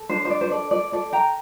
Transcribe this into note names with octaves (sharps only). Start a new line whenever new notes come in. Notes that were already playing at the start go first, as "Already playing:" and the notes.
Already playing: A4
D4 C5
C5
D5
C5
A4 D5
D5
A4 D5
G5 A#5